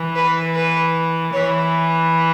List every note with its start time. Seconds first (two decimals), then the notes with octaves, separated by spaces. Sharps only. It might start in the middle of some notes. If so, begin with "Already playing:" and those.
Already playing: E3
0.16 B4
0.55 B4
1.33 E3 C#5